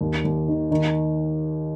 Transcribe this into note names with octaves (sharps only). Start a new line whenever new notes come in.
D#2
D#2
D#3
D#3